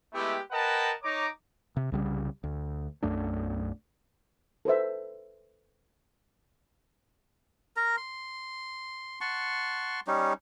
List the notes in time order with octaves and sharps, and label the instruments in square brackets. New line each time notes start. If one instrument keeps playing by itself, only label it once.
[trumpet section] G#3 A3 B3 E4 G4
A#4 B4 D#5 F#5 G5 A5
D#4 C#5 A#5 D6
[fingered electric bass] C3
C2 C#3 G3
D2
B1 F#2 A3 D4
[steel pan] A4 B4 C5 E5
[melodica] A#4 A#5
C6
F#5 A5 C6 C#6
G3 C#4 D#4